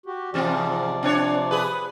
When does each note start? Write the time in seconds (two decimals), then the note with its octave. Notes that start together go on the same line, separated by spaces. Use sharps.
0.06 F#4 G4
0.34 G#2 C3 E3 F3 C4 D5
1.03 C4 D4 C#5
1.51 G#4 B4